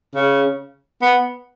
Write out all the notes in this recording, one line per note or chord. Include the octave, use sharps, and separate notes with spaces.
C#3
B3